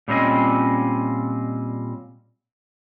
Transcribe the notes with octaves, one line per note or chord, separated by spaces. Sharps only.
A#2 G3 C4 C#4 D#5